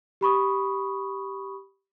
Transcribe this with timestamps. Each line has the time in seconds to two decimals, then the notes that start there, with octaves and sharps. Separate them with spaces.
0.21 G4 B5 C#6 D#6